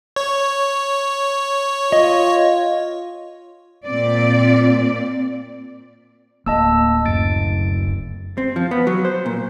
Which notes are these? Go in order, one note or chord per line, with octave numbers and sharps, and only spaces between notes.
C#5
F4 D#5
A#2 C4 D5
D1 A#3 D#5 A5 E6
F#2 C#3 A6 D7
C4
F3
B3
F#3
C5
A#2